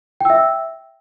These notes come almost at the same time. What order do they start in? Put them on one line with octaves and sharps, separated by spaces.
G5 E6 E5